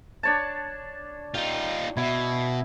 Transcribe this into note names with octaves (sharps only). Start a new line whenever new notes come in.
D4 C#5 A5
D#4 F4 G5
B2 E4